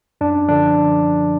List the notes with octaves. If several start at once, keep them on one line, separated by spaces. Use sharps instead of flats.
F#2 D4
D3 F3 D4